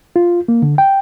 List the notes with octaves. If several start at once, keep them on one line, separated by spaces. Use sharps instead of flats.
F4
A#3
D3
G5